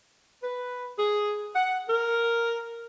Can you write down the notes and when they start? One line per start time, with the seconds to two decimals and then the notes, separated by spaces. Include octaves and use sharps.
0.42 B4
0.98 G#4
1.54 F#5
1.88 A#4